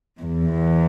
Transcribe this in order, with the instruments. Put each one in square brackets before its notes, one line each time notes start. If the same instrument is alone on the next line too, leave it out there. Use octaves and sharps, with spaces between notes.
[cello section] E2